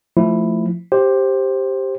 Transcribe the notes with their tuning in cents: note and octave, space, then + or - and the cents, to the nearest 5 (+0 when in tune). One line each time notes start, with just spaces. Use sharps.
F3 +0 A3 +0 E4 +0
G4 +0 C5 +10